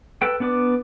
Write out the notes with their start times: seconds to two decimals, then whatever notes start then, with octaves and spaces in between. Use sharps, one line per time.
0.22 A4 B4 G5
0.40 B3 D4 B4 D5 D6